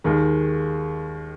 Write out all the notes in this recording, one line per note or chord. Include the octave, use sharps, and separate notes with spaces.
D#2 D#3 G#3